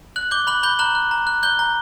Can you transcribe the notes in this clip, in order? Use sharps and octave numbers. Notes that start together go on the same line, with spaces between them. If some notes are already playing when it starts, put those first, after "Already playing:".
F#6 F#7
D6 G6 G7
B5 F#6 F#7
B5 G6 G7
A#5 F#6 F#7
F#6
A#5
F#6
F#6 G6 G7
A#5